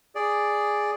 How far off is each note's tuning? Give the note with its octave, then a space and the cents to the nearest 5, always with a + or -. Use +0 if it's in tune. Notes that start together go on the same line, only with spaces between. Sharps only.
G#4 +0 D5 +0